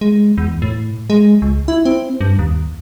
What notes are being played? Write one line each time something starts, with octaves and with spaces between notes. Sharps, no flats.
G#3
E2
A2
G#3
C#2
E4
C4
G2
D#2